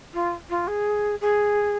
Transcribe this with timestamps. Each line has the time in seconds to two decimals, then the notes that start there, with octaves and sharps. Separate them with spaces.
0.13 F4
0.49 F4
0.67 G#4
1.21 G#4